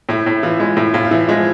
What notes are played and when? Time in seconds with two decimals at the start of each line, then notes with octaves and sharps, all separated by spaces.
0.09 A2 E4
0.26 A2
0.43 E3 F4
0.60 G#3
0.77 A2 E4
0.94 A2 F4
1.04 F4
1.11 E3 E4
1.28 F3 G#3